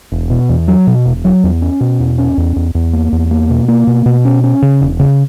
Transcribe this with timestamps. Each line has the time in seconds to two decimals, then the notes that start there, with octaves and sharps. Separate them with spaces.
0.12 E1
0.30 B2
0.49 E2
0.68 F#3
0.87 B2
1.06 E1
1.25 F#3
1.44 E2
1.62 C#4
1.81 B2
1.99 E2
2.18 C#4
2.37 E2
2.56 E2
2.75 E2
2.93 A#3
3.12 E2
3.31 A#3
3.50 B2
3.68 A#3
3.87 B2
4.06 B2
4.25 C#4
4.44 C#4
4.62 C#3
4.81 E1
4.99 C#3